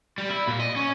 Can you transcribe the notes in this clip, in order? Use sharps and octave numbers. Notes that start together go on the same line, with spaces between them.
G3
E4
A#2
D#5
C#4